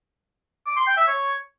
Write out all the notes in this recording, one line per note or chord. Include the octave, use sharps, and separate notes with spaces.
D6
C6
G5
E5
C#5